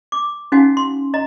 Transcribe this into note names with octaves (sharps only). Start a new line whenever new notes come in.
D6
C#4 D#4 F#4 F5 F#5 G#5
C6
D#5 A#5